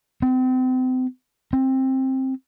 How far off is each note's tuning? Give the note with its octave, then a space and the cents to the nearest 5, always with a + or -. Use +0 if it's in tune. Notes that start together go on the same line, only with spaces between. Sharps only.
C4 -35
C4 +15